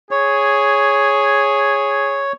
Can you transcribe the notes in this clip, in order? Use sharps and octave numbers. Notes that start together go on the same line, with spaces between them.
G#4 C#5